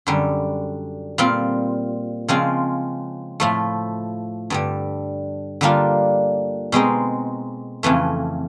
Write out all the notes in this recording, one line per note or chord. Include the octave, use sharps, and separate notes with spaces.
F#2 D3 G3
A#2 G3 C4 F4
C#3 F3 G#3 C4 F4
A2 F3 A3
G2 D3 G3
D3 G3 A#3 D4 F4
B2 G#3 C4 D#4
F2 C#3 E3 A3